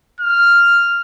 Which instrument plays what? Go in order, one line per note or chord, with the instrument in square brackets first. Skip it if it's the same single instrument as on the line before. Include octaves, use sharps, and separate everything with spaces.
[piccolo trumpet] F6